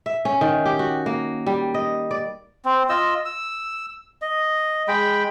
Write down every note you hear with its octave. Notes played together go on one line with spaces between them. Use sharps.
E5
C#4
D#3
G4
F#4
A#3
G3
D#5
D5
C4
F4 D#5 E6
E6
D#5
G#3 G5 B5